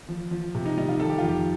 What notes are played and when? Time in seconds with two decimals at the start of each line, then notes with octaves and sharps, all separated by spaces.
0.09 F3
0.31 F3
0.55 C3
0.66 D#4
0.77 G3 D#4
0.89 F4
1.00 D#3 A4
1.09 G4
1.18 F2 F4
1.28 G4